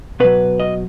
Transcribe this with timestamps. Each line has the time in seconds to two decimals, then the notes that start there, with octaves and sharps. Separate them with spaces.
0.20 B2 F#3 B4
0.60 D#5